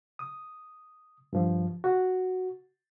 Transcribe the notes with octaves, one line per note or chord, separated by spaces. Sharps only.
D#6
G2 F3
F#4